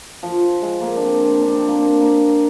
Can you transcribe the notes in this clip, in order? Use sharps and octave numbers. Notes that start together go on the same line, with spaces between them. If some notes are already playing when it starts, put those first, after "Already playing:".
F3
G#3
A#3
D4
C4
D4
C4
A#3
C4
A#3